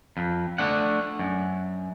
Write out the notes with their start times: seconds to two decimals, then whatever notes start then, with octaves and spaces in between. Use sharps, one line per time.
0.17 F2
0.58 A3 D4 F#5
1.19 F#2